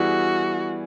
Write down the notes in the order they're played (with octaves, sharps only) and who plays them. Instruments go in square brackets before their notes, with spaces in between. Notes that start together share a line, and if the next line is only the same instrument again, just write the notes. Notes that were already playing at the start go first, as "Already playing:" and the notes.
Already playing: [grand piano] E3 G3 B3 E4 G#4 [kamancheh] F#4